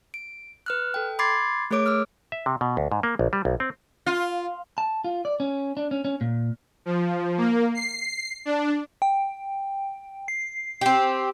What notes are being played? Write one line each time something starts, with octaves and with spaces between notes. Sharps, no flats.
D7
B4 F6 F#6
A4 G5
B5 C6 D6 G#6 A6 C7
A3 G#4 A#4 C#5 D6 D7
D6 E6 F6
E5
C3
B2
D2
G#2
A#3
A#1
G3
B1
C4
F4
A5
F4
D5
C#4
D4
C#4
C#4
A#2
F3
A#3
C7
D4
G5
C7
C4 G4